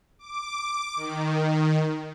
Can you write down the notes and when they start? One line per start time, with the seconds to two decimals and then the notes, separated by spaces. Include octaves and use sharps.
0.19 D6
0.96 D#3